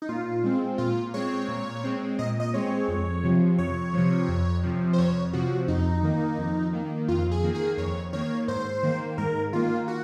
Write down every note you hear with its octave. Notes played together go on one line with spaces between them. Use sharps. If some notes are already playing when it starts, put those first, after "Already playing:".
D#4
A#2 F4
G#3 C4
A#2 F4
G#3 C4 C#5
A#2
G#3 C4
A#2 D#5
D#5
G#3 C4 C#5
F2
C3 F3
F2 C#5
C3 F3
F2
C3 F3
C5
F2 C#5
C3 F3 F#4
F2 D#4
D#3 A#3
F2
D#3 A#3
F2 F4
G#4
D#3 A#3
G#4
F2 C#5
D#3 A#3 C#5
G#2 C5
D#3 A#3
G#2 A#4
D#3 A#3 F4
F#4